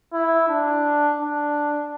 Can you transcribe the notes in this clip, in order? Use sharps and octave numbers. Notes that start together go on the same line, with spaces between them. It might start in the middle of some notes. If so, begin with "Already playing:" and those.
E4
D4
D4